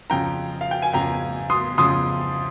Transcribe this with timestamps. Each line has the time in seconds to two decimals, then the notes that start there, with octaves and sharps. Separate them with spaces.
0.10 F2 C#3 F3 G5 A#5
0.61 F5
0.71 G5
0.82 G#5
0.93 F2 C#3 F3 G5 A#5
1.50 C6 D#6
1.78 F2 C#3 F3 C6 D#6